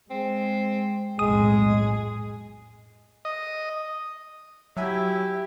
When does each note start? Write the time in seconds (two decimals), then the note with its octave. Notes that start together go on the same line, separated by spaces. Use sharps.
0.11 G#3 C4
1.19 B1 F2 A2 G#3 G#4 D#6
3.25 D#5
4.77 F#3 E4 G4 E5 G#5